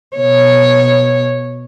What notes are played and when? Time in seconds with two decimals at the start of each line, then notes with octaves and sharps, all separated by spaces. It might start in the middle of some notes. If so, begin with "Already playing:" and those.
0.17 B2 C#5